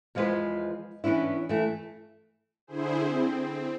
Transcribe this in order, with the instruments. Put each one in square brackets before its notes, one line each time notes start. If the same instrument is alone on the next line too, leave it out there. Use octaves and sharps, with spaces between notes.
[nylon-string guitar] E2 F3 G#3 G4 B4 C5
E3 B3 C#4 D4 E4
E3 A3
[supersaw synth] D3 E4 G#4 C5
C4